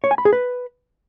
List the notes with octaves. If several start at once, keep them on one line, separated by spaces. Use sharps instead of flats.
C#5
G#5
B5
G#4
B4